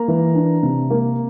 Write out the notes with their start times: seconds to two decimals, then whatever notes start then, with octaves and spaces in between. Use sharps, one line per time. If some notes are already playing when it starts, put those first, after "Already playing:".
Already playing: A#3 A#5
0.08 E3
0.35 D4
0.63 C3
0.90 A#3